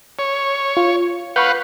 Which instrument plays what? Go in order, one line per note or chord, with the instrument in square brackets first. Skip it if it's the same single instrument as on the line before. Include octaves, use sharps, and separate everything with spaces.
[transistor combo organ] C#5
[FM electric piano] F4
[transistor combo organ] B4 F5 F#5 [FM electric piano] B5 C#6 G6